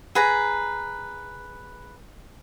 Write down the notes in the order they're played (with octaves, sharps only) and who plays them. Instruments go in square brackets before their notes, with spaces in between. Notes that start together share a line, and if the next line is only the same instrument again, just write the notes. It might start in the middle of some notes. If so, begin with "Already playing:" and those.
[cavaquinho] G#4 B4 A#5